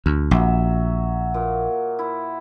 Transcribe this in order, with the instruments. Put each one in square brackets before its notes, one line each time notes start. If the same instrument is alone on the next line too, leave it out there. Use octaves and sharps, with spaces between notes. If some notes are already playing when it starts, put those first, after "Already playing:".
[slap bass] D2
[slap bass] A#1 [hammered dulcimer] F#3 E5
[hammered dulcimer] A#2
E4